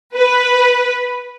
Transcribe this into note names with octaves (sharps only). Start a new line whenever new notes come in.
B4